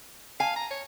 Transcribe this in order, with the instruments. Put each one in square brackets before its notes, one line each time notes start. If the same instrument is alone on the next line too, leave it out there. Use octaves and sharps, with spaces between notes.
[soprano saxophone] F5 [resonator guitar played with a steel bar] G#5
[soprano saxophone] A#5
C#5